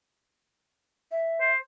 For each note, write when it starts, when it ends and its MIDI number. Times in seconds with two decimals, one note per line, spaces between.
1.12 1.50 76
1.40 1.57 72